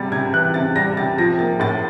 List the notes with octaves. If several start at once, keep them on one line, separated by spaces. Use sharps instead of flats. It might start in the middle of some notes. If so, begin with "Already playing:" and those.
Already playing: C3 G3 A6
C3 G#6
E3 F#6
C3 A6
G3 A#6
C3 A6
F3 A#6
A#3 A6
A2 A6